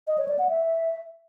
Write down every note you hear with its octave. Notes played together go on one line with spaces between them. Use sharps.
D#5
C#5
D5
F#5
E5